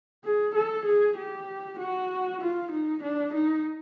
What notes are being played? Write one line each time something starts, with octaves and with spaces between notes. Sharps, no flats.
G#4
A4
G#4
G4
F#4
F4
D#4
D4
D#4